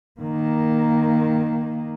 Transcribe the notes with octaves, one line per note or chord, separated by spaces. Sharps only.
D#3 A#3